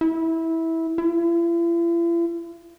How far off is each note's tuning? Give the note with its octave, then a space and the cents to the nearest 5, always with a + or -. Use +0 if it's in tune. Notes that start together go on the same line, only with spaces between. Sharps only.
E4 -15
E4 +45